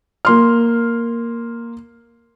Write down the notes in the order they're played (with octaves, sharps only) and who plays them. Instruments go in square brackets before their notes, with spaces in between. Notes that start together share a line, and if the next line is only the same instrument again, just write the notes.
[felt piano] A#3 C6 F6